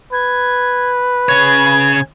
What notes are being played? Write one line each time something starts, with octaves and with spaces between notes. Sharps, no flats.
B4 G#6
C#3 C#5 G#6